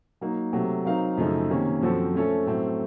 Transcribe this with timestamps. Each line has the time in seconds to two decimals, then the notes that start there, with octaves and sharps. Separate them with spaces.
0.21 F#3 A#3 D#4
0.53 C3 F#3 A3
0.85 F#3 C4 D#4 A#4 F5
1.17 F#2 C#3 F3 A3 D#4
1.50 C3 D#3 A#3 C#4
1.81 F#2 F3 C4 F#4 A4
2.14 F3 A3 C#4 A4
2.46 A2 F#3 A3 C4